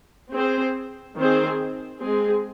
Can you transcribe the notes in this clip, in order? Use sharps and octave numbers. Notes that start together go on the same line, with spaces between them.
C4 G#4 C5
D#3 C4 G#4 C5
G#3 C4 G#4